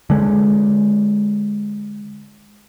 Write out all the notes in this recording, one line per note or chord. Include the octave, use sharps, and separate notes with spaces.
D3 G#3